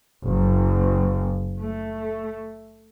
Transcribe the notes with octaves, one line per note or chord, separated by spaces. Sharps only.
F#1
A3